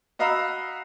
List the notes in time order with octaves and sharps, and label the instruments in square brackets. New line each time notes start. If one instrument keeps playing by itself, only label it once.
[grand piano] F#4 D#5 F5 A#5 B5 E6